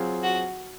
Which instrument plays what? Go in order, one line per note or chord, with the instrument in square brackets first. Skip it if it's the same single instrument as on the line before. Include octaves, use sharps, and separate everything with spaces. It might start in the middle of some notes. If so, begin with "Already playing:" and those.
Already playing: [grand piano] F#3 C4 F4 G#4
[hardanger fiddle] F#4